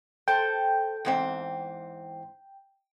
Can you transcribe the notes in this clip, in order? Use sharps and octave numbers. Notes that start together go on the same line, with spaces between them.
A4 C5 G5
E2 G#2 C4